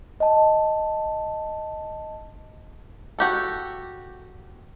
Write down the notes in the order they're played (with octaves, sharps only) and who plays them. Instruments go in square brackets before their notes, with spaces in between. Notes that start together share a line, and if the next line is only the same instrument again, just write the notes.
[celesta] D#5 A5
[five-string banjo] F#4 G4 A4